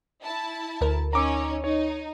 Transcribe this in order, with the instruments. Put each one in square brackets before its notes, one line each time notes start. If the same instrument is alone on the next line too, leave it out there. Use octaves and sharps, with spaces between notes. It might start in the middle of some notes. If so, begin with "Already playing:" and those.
[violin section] E4 A5
[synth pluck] D2 A#4
[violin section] C#4 D#4 C#5 [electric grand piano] A#5 D6 E6
[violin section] D#4 [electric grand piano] C#5